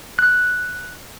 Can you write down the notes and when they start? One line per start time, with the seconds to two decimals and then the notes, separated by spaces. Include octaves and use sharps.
0.19 F#6